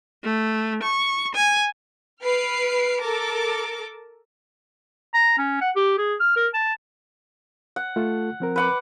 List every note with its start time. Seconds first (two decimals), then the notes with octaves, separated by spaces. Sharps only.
0.24 A3
0.83 C#6
1.35 G#5
2.22 B4 F6 C7 D7
3.00 A4 A#4 A5 D6
5.14 A#5
5.38 C#4
5.61 F#5
5.76 G4
5.98 G#4
6.20 F6
6.36 A#4
6.54 A5
7.76 F#5
7.96 A3 F4 A4
8.40 F3 C4 A#4
8.56 B4 F#5 D6